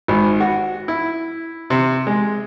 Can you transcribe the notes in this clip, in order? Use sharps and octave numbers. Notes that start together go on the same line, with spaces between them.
G#1
F#4
E4
C3
G#3